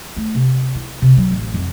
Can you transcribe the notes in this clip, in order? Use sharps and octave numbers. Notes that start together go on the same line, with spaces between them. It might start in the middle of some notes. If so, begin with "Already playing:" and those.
A3
C3
E4
C3
F#3
A1
F2